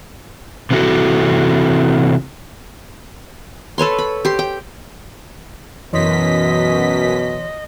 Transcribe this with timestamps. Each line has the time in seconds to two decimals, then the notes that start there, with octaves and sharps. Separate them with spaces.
0.71 C3 E3 B3 E4 F#4 A4
3.78 A4 B4 C#5 C6
3.98 B5
4.25 G4 C6
4.39 G5
5.93 F#2 B2 E3 C#5 D#5 C6 B6